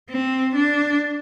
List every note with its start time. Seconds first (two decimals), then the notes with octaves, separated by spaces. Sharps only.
0.10 C4
0.55 D4